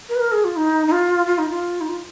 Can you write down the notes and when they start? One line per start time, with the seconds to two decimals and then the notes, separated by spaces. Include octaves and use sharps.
0.09 A#4
0.15 B4
0.20 A#4
0.32 G#4
0.44 F4
0.56 D#4
0.87 D#4
0.92 F4
1.27 F4
1.38 D#4
1.50 F4
1.81 D#4
1.89 F4